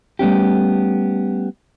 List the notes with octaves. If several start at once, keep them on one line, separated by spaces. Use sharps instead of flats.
G3 A3 B3 C#4 G4